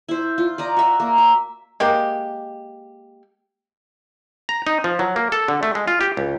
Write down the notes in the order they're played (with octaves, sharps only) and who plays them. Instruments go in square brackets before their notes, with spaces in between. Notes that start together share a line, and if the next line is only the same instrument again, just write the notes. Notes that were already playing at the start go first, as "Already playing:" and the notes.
[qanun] E4 C5
F4
D5 D#5 A#5
F#4 E5
A#3
E5
[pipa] G#3 A#3 G4
[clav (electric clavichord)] A#5
D#4
F3
F#3
A#3
A4
D3
A3
G#3
F4
G4
C#2